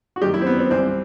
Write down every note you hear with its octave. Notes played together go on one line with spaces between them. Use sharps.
F#4
F#2 D#3 G4
E4
C4
B3
C4
C2 C3 E3 C4